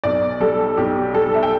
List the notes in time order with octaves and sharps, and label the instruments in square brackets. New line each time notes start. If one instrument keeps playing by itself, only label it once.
[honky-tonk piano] B1 D5
G3 A4
B1 G4
G3 A4
E5
G5